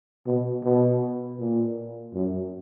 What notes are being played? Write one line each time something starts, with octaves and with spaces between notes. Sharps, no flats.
B2
B2
A#2
F#2